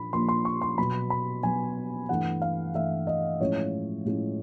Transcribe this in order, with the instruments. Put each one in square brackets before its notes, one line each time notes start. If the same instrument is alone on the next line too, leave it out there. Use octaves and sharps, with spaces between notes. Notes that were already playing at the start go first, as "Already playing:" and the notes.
Already playing: [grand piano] A#2 F3 A#3 D4 B5
A#2 F3 A#3 D4 C6
C6
C#6
C6
B2 F#3 B3 B5
B5
B2 F#3 B3 G#5
G2 E3 A3 F#5
F5
G2 E3 A3 E5
D#5
A2 F3 G#3 C#4 E4 C#5
A2 F3 G#3 C#4 E4